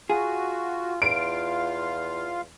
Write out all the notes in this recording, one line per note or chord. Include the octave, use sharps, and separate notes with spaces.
F4 F#4 G#4
E2 F4 F5 D7